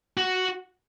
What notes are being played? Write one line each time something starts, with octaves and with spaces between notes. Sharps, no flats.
F#4